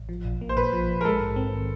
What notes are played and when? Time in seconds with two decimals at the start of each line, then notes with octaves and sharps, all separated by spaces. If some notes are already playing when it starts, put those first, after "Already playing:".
Already playing: A1
0.09 F3
0.25 A#1
0.41 A#3
0.49 C5
0.57 A#2 B4
0.73 F3
0.89 A#1
1.01 A#4
1.05 G#3 A4
1.20 G#2
1.36 C4
1.53 D#3